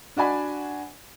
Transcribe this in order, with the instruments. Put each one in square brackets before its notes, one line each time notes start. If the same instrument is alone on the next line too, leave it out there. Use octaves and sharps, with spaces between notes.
[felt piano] D4 F#4 D5 G#5 B5